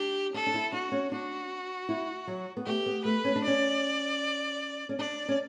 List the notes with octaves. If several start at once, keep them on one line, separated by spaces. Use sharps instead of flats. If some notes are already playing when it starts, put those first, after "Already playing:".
Already playing: D4 G4
D4 A4
D4
E4
D4 F#4
C#4
D4 F#4
E4
F#3
B3
A3 G4
B3
A3 B4
C#4
D4
C#4 D5
C#4
D4 D5
C#4